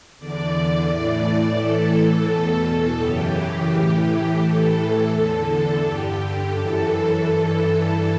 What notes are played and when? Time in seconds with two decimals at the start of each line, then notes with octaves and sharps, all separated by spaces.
0.19 E2 D3 D5
0.89 A2 E3
1.59 A2 E3 A4
2.29 E2 B2
3.00 F#2 C#3 E3 G4
3.71 A2 E3
4.41 A2 E3 A4
5.11 E2 D3
5.82 G2 D3 G4
6.52 F#2 E3 A4
7.23 G2 E3